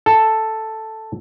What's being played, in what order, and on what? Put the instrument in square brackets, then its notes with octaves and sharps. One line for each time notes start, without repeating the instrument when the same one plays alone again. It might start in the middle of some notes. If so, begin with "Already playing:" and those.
[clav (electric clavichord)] A4